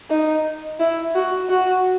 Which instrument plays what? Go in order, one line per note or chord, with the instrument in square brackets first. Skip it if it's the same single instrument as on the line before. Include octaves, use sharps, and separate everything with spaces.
[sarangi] D#4
E4
F#4
F#4